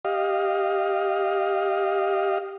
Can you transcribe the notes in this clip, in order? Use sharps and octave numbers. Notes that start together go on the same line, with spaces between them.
G4 D#5 F5